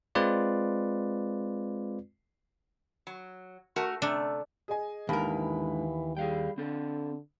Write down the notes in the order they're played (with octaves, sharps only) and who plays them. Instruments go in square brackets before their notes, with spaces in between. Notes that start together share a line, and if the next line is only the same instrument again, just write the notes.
[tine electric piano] G#3 C4 F4 B4 D5
[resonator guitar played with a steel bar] F#3
A3 F#4 A#4
[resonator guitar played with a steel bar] C3 A3 [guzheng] D4
[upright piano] G#4 D#5 G#5
[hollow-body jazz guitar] D#2 A#4 [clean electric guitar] G#2 D3 [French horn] E3 [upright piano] B5
[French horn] G3 [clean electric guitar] G#4 F5 G5
[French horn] D3 [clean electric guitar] C4 A4